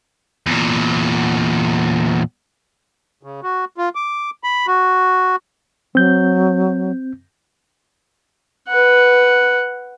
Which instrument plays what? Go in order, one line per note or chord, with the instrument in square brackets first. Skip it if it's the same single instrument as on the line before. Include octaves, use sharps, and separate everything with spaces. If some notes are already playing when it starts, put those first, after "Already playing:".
[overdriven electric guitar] E2 A#2
[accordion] C#3
F#4
F4
D6
B5
F#4
[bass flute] F#3 [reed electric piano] C4 G6
[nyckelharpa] B4 F#5